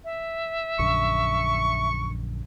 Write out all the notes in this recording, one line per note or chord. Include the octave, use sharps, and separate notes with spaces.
E5
A#1 F#2 D3 C#6